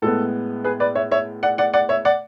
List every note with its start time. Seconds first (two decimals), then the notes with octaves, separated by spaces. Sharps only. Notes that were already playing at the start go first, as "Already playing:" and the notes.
0.02 A2 G#3 B3 A4
0.64 G#4 B4
0.80 B4 D5
0.95 C#5 E5
1.11 C#5 E5
1.43 D5 F#5
1.58 D5 F#5
1.74 D5 F#5
1.89 C#5 E5
2.05 D5 F#5